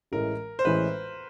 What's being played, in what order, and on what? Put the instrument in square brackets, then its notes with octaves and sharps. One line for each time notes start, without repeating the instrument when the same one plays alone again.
[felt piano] A1 A2 E3 G#3 [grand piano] A#4
[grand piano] C5
[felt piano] A1 A2 E3 G#3 [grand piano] B4